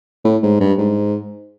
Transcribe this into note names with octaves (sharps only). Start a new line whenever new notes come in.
A2
G#2
G2
G#2